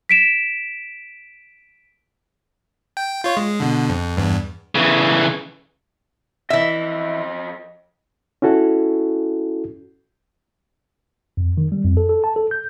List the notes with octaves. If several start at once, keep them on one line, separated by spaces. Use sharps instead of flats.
B6 D7 E7
G5
F4 C#5
G#3
B2 D3
F2
E2 G2
C#3 E3
F2 E3 D#5 E5
C#4 E4 F#4 A4
F2
D#3
G3
F2
A4
A4
A5
A4
G6